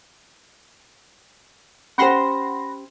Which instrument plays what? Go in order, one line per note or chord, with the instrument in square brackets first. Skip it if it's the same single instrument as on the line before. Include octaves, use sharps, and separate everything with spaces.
[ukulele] C#4 G4 C5 [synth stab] F#5 C6 A#6 [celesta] B5